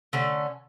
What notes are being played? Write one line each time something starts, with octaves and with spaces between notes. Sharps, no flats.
D3 A3 C#4